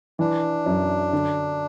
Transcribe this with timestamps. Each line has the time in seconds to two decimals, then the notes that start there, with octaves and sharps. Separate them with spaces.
0.19 E3 D4
0.66 F#2
1.13 D3